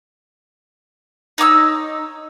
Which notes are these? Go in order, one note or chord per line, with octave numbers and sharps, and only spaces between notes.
D#4 C#5 D6 E6